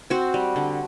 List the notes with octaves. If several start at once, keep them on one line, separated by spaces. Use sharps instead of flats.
C4 F#4
G3
D3